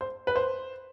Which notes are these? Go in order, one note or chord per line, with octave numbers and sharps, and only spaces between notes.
C5
B4
C5